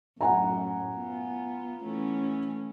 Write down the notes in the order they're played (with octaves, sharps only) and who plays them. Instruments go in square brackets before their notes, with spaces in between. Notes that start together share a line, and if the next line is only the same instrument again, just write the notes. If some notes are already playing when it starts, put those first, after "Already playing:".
[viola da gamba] F#2 A2 [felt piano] F#5 G#5 A#5
[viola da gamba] B3 F4
E3 A3 C#4